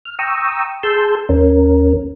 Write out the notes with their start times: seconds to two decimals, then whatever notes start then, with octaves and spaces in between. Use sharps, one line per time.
0.05 F6
0.19 G5 A#5 C#6 D#6 E6
0.83 G#4 A5 C6 E6 G6
1.29 D#2 C#4 A#4